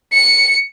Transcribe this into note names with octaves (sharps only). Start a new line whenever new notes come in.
C#7